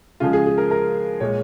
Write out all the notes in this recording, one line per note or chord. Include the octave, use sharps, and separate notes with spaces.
C#3 F3 G#3 F4
G#4
G#4
A#4
A#4
A#2 G#3 C#5